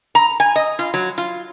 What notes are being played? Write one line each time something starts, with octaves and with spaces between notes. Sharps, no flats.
A#5
G#5
D#5
F4
F#3
F4